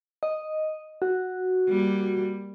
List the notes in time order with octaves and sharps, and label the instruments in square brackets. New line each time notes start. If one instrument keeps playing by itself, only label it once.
[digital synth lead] D#5
F#4
[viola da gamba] G3 A#3